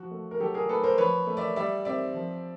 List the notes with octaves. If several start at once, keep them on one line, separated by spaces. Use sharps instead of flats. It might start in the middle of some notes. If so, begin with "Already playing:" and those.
Already playing: F3 F#4
A3
A#4
F#3 G4 A4
G#4 A#4
A3 A4 B4
A#4 C5
F3 B4 C#5
A3
D5 E5
G3 D5 E5
C4 D5 E5
F3